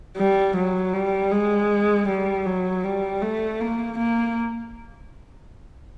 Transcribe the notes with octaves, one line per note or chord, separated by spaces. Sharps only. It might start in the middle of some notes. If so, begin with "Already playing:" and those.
G3
F#3
G3
G#3
G3
F#3
G3
A3
A#3
A#3